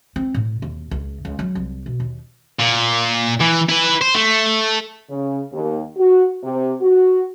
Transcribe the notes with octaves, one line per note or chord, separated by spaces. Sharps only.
C4
A2
D#2
C#2
C#2
F#3
C2
B2
D#2
A#2
E3
E4 B4
C5
A3
C#3
D#2
F#4
C3
F#4